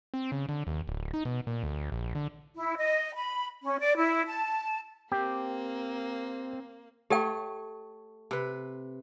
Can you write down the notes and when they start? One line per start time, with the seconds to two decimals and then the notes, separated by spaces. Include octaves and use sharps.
0.14 C4
0.32 C#3
0.49 D3
0.67 D#2
0.88 D1
1.14 D#4
1.25 B2
1.47 A#2
1.63 D2
1.92 A#1
2.15 D3
2.58 E4
2.78 D#5
3.16 B5
3.63 C#4
3.80 D5
3.96 E4
4.26 A5
5.12 A#3 C4 G4
7.10 A3 G4 A4 C#5 G5
8.31 C3 B4